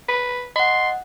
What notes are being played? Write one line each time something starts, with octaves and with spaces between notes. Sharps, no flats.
B4
D#5 F#5 C6